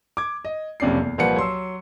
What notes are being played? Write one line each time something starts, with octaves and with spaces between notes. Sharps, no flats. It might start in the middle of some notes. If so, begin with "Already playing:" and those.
D6 G#6
D#5
F#1 F2 C3 C#4 D5 C7
E2
C2 A#2 F3 B4 F#5 C#7
F#3 C6 E6